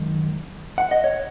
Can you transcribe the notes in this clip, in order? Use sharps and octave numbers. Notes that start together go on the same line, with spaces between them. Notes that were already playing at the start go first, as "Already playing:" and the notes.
Already playing: F#2 D#3 G#3
F#5
D#5
C#5